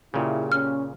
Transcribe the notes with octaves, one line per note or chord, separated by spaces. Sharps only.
A#2 C#3 A#3 E4 G4 G#4
C#4 F6